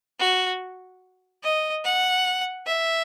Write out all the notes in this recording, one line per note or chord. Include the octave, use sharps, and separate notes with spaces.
F#4
D#5
F#5
E5